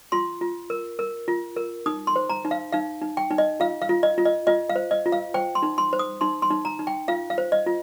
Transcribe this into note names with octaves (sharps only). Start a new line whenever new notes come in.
F4 C6
F4
A#4
A#4
F4
A#4
D#4 D#6
C6
C5
A#5
D#4
F5
D#4 F5
D#4
G5
D#4
D#5
F4 F5
F5
F4
D#5
F4
D#5
F4 D#5
F5
C5
D#5
F4
F5
C5 G5
C6
D#4
C6
C5
D#6
D#4 C6
C6
D#4
A#5
D#4
G5
F4 F5
F5
C5
D#5
F4